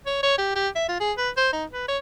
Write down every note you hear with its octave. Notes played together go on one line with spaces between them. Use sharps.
C#5
C#5
G4
G4
E5
F4
G#4
B4
C5
D#4
B4
C#5